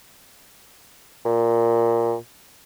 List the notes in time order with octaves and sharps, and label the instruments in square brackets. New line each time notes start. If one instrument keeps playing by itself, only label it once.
[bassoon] A#2